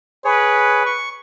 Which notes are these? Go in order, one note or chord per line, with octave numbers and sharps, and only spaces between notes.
G#4 B4 C#5
C#6